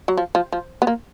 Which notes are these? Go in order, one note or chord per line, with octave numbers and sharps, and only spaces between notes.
F#3
F3
F3
F3
B3
A#3